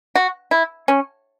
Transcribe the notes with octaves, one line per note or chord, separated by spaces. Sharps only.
F#4
E4
C#4